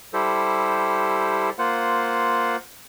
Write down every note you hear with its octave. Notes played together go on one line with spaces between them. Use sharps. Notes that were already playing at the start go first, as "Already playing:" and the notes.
G3 E4 G4 A4 C5
A#3 F4 C5 F#5